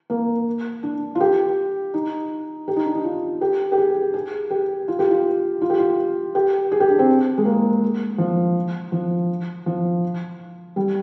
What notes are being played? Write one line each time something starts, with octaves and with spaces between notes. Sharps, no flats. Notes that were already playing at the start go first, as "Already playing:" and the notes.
A#3
D4
F4
G4
D#4
G4
D#4
D4
D#4
F4
G4
G4
G#4
G#4
G4
F4
G4
F4
F4
G4
F4
G4
G#4
G4
D4
C4
G#3
A#3
F3
F3
F3
G3